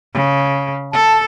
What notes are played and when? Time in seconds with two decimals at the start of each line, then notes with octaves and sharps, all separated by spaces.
0.14 C#3
0.93 A4 A5